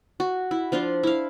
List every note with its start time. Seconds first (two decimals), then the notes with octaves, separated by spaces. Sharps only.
0.20 F#4
0.51 E4
0.72 F3 D4 F4 C6
1.03 E4 F5